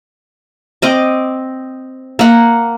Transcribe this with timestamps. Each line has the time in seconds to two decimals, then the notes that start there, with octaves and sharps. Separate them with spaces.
0.82 C4 D#5 D6
2.19 A#3 F#5